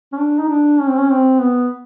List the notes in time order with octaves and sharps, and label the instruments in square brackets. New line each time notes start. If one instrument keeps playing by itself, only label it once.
[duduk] C#4
D4
D#4
D4
C#4
C4
C#4
C4
B3